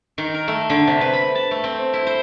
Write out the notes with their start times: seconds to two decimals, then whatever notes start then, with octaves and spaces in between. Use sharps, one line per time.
0.18 D#3
0.34 A#4
0.48 A3
0.70 D3
0.87 C3
1.01 B4
1.13 B5
1.35 A5
1.51 A3
1.64 C4
1.93 E4
2.07 C5